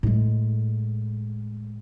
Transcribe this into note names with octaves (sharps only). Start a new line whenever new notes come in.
A2 G#3